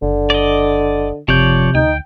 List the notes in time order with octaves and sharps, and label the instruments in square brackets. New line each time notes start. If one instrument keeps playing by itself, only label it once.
[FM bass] F#1 [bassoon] D3
[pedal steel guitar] D5 D#5
[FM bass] F#1 [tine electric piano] C3 G6 [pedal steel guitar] F3 C#5 D5
[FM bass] D2 [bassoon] D#4 [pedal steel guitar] G5